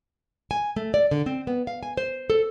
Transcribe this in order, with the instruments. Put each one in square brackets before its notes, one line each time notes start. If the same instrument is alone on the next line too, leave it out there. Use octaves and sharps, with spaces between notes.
[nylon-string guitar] G#5
A3
D5
D3
C4
B3
F5
G#5
C5
A4